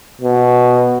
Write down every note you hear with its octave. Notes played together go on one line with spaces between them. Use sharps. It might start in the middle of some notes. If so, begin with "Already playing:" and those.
B2